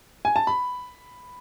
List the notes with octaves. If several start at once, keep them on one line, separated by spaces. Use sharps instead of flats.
G#5
A5
B5